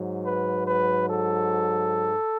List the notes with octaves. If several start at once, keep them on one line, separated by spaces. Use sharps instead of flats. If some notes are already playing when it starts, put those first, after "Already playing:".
Already playing: G#2 F#3
B4
B4
A4